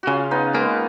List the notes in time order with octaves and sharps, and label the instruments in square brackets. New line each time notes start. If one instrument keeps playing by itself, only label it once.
[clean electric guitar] C#3 [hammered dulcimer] C#4 F4 F#4
[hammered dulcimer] B3 D#4
[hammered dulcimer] G#3 B3 [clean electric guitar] A#3